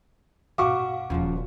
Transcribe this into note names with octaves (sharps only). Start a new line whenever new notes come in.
G2 B2 F#4 F5 F#5 C#6 D6
D#1 C#3 F3 F4